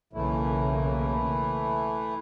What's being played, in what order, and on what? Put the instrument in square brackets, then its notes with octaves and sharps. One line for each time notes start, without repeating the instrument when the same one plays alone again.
[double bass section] B1 C#3 A#3 [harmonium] E3 A3 E4